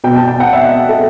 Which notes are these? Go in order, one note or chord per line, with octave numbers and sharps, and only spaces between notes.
B2 G5
A5
G5
F#5
E5
D#5
A4